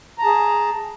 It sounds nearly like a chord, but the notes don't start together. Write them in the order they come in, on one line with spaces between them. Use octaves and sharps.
A#5 A5 G#4